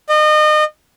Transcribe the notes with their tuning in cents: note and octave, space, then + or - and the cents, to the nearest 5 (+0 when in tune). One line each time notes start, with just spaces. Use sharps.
D#5 -30